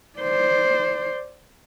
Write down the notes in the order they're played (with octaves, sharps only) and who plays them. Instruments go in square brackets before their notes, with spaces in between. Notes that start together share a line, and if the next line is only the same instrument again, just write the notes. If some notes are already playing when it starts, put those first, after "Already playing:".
[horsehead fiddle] C5 D5